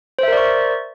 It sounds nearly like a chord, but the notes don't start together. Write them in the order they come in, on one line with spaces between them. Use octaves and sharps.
C5 E5 A#4 D5 C#6